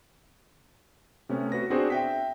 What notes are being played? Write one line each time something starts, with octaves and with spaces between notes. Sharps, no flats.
C3 A3 B3 C#4
F#4 B4 A#6
B3 C4 D4 F#4 G#4 C5
E5 G5 B6